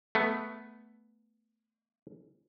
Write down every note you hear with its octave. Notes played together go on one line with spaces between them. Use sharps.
A3 B3